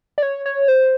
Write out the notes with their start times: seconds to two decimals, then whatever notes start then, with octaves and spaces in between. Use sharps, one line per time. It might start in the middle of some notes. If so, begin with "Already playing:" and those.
0.18 D5
0.23 C#5
0.46 C#5
0.68 C5